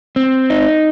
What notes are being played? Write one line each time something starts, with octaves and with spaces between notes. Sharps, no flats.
C4
D#4